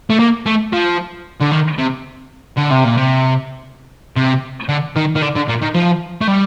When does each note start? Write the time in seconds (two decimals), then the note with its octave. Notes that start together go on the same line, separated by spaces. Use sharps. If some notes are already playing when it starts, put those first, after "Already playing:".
0.10 A3
0.19 A#3
0.46 A3
0.73 F3
1.40 D3
1.51 D#3
1.79 C3
2.57 D3
2.71 C3
2.85 A#2
2.97 C3
4.16 C3
4.69 D3
4.96 D#3
5.15 D#3
5.22 D3
5.35 D3
5.48 A#2
5.61 D#3
5.74 F3
6.21 A3
6.28 G3